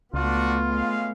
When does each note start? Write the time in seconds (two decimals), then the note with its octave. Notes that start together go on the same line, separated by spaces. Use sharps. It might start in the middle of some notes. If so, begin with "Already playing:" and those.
0.14 C#2 A3 B3 D4 F4 F#4
0.69 G#3 C#4 F5